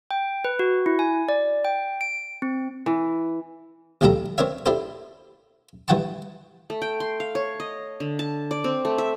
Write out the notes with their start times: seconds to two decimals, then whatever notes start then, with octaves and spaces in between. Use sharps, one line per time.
0.11 G5
0.44 B4
0.59 F#4
0.86 E4
0.99 G#5
1.29 D5
1.65 G5
2.01 D7
2.42 C4
2.86 E3
4.01 A#1 D#2 G3 G4 A4 A#5
4.38 C4 D4 A#4 C#5 E5
4.66 D4 E4 G4 A4 C5
5.88 G2 E3 F#5 G5 A5 C#6
6.70 A3
6.82 G5
7.00 C6
7.20 F5
7.35 C#5
7.60 D#5
8.00 D3
8.19 A5
8.51 D5
8.64 C4
8.85 A3
8.98 E5